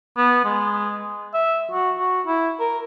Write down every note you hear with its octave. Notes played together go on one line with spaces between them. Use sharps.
B3
G#3
E5
F#4
F#4
E4
A#4